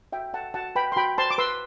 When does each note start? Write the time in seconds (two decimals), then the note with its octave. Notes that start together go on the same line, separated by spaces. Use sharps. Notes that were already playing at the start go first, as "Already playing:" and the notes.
0.13 F#4 E5 G5
0.33 A4 F#5 A5
0.54 F#4 F#5 A5
0.75 B4 G5 B5
0.92 C6
0.96 F#4 G5 B5
1.18 C5 A5 C6
1.31 D6
1.38 B4 C6 E6